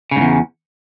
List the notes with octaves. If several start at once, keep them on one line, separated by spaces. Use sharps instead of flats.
E2 G#2 C#3